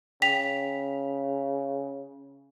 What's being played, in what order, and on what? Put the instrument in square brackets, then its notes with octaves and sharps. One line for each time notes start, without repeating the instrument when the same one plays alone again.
[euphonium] C#3 [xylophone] G5 B6 F7